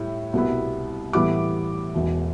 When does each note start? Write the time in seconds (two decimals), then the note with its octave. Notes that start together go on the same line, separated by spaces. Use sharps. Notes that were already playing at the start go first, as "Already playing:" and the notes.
Already playing: A2 G3 E4
0.33 C2 B2 G3 B3 E4
1.13 A2 E3 G3 B3 E4 D6
1.94 E1 E2 B2